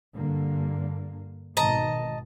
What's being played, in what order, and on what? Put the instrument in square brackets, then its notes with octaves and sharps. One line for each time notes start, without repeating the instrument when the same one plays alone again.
[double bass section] G2 D3 A#3
[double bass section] G#1 B2 D#3 [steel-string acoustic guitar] D#5 A5 A#5